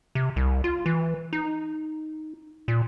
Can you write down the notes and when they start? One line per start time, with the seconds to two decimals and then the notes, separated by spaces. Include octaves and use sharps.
0.15 C3
0.36 C2
0.64 F4
0.86 E3
1.33 D#4
2.68 A#2